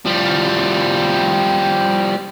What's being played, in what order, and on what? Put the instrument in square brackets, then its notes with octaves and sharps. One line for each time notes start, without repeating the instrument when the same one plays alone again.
[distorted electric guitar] F3 G3